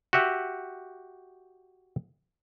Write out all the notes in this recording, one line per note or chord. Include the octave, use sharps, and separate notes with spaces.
F#4 G4 E5 F#5